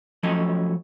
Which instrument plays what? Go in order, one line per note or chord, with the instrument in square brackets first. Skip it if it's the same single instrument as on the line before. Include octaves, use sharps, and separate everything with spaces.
[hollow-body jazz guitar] F3 F#3 A3 C#4 C#5 D#5